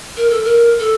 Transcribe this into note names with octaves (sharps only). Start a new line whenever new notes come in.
A#4
A4
A#4
A4